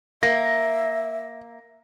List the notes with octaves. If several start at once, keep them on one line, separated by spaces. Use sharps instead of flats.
A#3 E5 A#6